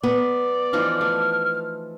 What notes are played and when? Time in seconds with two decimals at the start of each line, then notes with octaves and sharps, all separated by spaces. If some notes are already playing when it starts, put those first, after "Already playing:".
0.03 B3 D5
0.73 E3 F3 D#4 F6
1.01 A3